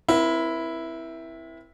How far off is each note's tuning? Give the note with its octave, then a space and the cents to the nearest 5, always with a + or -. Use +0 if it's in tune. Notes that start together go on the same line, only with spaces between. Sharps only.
C4 +0 E4 +0 A#4 +40